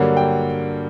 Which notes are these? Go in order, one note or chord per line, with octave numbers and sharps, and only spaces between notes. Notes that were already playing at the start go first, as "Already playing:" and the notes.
Already playing: G2 D3 F#3 A#3
G5